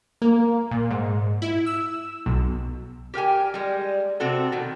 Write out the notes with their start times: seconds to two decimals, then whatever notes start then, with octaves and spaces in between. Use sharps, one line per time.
0.22 A#3
0.71 A#2
0.91 G#2
1.42 E4
1.66 E6
2.26 B1
3.14 G4 A#4 G5 G#5
3.54 G3 G#3
4.20 C3 C4 F#4 A4
4.52 B2 D#3